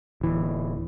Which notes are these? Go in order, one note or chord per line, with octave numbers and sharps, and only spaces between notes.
D1 E3